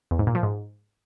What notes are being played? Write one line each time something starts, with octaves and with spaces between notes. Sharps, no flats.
E2
G#2
A#2
F3
G#2